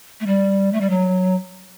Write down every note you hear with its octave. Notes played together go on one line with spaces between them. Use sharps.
A3
G3
A3
G3
F#3